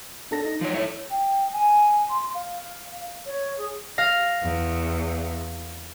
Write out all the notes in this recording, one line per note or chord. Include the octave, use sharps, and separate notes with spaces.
D4 A4 A#6
D#4
F3 C#5
G#2 E4 A4 C#5 E5
G5
G#5
C6
F5
C#5
G#4
F5 A#6
E2